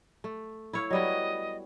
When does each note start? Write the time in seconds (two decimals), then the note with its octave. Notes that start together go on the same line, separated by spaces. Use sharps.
0.24 A3
0.73 E4 C#5 F5
0.90 F#3 G3 B3 D#5